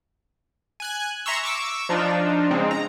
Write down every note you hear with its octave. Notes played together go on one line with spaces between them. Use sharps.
G#5 F#6 G#6
E5 A#5 C6 C#6 E6
C#6 D6 E6
F3 D4 D#4 F4
C#3 G#3 C4 D#4
A#5